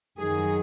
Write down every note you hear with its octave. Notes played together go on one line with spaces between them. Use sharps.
F#2 D#3 F#3 G#4